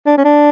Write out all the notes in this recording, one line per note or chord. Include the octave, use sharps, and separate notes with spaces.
D4
C#4
D4